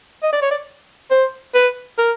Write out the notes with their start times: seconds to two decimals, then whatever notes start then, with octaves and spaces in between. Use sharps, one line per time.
0.23 D#5
0.33 D5
0.42 C#5
0.51 D5
1.11 C5
1.54 B4
1.99 A#4